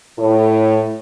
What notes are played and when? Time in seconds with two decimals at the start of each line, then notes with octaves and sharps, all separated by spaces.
0.19 A2